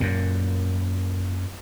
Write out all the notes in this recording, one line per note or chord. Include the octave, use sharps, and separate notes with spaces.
F#2 A#2